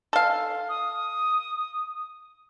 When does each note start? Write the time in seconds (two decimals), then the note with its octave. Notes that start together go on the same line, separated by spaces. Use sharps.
0.13 A4 F5
0.69 D#6